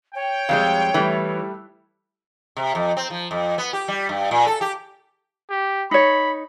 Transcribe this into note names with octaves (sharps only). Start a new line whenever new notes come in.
C#5 G5
F2 G3 G#3 F5
E3 G3 A3
C3
F2
C4
F3
F2
B3
G4
G3
G2
A#2
A4
G4
G4
D#4 C#5 B5